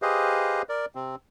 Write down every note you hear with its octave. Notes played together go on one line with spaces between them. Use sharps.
G4 G#4 B4 C5 D#5 F5
A#4 D5
C3 C4